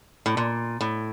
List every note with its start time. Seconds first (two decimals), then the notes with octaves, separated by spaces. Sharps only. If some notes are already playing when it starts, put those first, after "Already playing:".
0.26 A2
0.37 A#2
0.81 A2